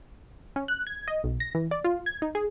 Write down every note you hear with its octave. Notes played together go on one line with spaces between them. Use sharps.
C#4
F#6
G#6
D#5
B1
A#6
E3
D5
F4
G#6
D#4
G#4